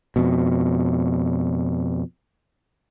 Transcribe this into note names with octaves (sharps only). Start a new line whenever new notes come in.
F2 B2